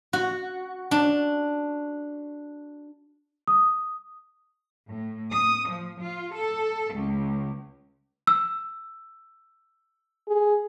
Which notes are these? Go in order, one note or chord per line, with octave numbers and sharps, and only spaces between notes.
F#4
D4
D#6
A2
D#6
F3
F4
A4
C#2
E6
G#4